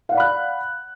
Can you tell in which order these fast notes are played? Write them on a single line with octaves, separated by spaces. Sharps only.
F5 F#5 D5 B5 F#6